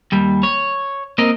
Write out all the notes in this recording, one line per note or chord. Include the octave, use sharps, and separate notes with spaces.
D#2 G3
C#5
A#3 C4 A#4 D#5